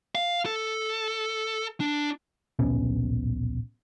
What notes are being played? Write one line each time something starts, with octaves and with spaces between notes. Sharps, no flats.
F5
A4
D4
D1 A#1 B2 C#4